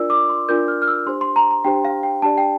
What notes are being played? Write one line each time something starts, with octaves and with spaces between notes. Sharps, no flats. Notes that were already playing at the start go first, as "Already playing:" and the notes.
Already playing: D4 F4 A#4 D5 E6
D6
C6
D4 F4 A#4 D5 G6
F6
F6
E6
D4 G4 C5 C6
C6
A#5
A#5
D4 G4 C5 G5
F5
G5
D4 G4 D5 A5
G5